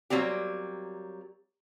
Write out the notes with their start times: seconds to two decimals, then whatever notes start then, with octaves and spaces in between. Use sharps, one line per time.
0.10 F#3 G3 A#3 C4 G4